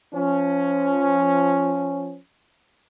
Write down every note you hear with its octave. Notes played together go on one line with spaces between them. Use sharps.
F3 C#4